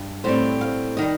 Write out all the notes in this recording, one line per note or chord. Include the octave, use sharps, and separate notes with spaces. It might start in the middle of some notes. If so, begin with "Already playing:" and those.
Already playing: G2
A2 G3 C4 C5
F5
D#3 G3 D#5